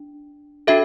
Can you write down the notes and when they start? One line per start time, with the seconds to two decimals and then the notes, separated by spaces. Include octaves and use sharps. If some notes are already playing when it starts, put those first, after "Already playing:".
Already playing: D4
0.67 D4 F#4 A4 E5